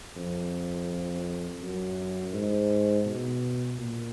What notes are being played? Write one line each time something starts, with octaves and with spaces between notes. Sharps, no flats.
F2
F#2
G#2
B2
A#2